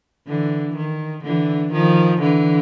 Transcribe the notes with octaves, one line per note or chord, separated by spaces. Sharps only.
D3 E3
D#3
D3 E3
D#3 F3
D3 E3